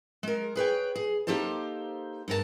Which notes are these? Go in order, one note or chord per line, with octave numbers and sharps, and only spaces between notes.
G#3 A#4
G#4 B4 C#5 G5
G#4
A#3 D#4 G4 A4 C5 A5
G2 B3 A#4 B4 A5